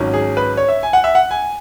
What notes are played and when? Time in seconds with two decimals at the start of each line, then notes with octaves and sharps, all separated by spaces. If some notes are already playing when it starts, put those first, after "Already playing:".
Already playing: G#1 G#2 F#3 C#4
0.14 G#4
0.37 B4
0.57 C#5
0.68 E5
0.83 G#5
0.93 F#5
1.04 E5
1.15 F#5
1.31 G#5